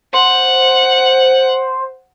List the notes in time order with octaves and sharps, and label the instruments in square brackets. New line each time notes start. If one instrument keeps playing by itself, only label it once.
[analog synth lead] C5 [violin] F#5